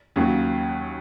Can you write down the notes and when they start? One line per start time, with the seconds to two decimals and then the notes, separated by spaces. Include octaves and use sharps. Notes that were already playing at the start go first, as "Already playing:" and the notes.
0.16 D#2 C#3 F#3